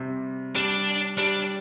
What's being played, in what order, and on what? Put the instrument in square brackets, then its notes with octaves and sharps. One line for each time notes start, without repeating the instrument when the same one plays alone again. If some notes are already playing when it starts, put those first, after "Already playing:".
Already playing: [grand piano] C3 G3
[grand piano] G3 [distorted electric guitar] D4
[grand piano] G3 [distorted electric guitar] D4